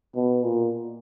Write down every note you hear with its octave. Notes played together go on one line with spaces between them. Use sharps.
B2
A#2